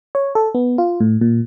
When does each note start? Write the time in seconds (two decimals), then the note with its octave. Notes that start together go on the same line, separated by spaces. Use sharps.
0.15 C#5
0.35 A4
0.55 B3
0.78 F4
1.00 A2
1.21 A#2